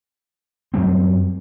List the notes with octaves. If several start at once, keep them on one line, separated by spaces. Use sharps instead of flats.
F#2 F#3 G3 C4